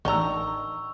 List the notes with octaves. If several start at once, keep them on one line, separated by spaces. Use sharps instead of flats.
A1 D#3 D4 A#5 C#6 E6